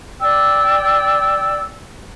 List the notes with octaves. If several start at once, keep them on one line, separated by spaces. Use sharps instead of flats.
D5 G5 E6